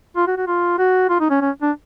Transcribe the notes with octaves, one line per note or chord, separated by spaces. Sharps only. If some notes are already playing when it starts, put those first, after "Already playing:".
F4
F#4
F#4
F4
F#4
F4
D#4
C#4
C#4
D4